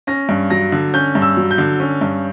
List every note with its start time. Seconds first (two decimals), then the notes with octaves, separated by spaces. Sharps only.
0.07 C#4 A#6
0.29 G2
0.50 F#3 A#6
0.72 D3
0.94 C#4 G6
1.15 G2
1.22 E6
1.37 F#3
1.51 G6
1.58 D3
1.80 C#4
2.01 G2